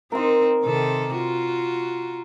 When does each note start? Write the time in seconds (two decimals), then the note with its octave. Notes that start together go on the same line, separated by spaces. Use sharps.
0.12 C4 D#4 A#4 C6
0.64 C3 D#3 A4
1.15 F4 F#4